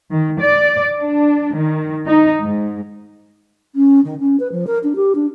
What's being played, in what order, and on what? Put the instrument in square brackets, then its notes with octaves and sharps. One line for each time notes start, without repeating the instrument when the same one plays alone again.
[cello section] D#3
D5
D4
D#3
D#4
G#2
[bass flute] C#4
D#3
C#4
B4
F3
A#4
D4
G4
D4